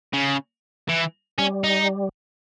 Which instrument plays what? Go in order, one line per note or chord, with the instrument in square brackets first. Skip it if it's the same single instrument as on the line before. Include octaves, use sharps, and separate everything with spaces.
[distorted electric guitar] C#3
E3
[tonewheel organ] G3 [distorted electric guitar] C#4
[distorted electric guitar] D#4